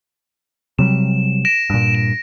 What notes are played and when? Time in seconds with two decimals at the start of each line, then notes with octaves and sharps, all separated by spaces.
0.79 C3 F#3 G3 E7
1.45 A#6 D7 E7
1.70 G2 A#2
1.95 E7